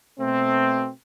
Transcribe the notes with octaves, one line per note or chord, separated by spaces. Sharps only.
B2 A3 C4